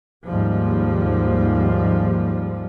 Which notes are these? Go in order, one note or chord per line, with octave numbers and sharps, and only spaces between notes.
D#2 G#2 F3 G3